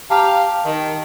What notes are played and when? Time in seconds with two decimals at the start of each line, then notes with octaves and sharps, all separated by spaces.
0.10 G4 F5 A5 A#5 F6
0.65 D#3